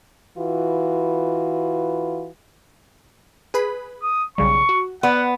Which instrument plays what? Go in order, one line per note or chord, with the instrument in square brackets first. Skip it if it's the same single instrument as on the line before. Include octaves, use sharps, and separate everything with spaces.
[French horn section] E3 F4 F#4 B4
[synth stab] G#4 B4 B5
[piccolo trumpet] D#6
[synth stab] B1 C#3 G3 [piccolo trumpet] C#6
[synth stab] F#4
[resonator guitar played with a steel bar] B3 [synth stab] D5 [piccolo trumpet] F#5